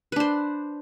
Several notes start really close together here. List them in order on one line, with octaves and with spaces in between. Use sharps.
B4 D4 C5